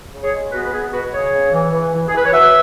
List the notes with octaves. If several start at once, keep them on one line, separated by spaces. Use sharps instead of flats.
C#3
G#4 C#5
G#3
B3 F#4 B4
B4
B3 G#4
B2 F#4 B4
C#3 G#4 C#5
C#3
E3
E3
E3
G#4
E3 B4
C#5
F#3 B4 E5